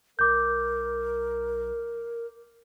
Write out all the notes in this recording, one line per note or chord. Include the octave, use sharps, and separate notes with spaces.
B1 A#4 D6 G6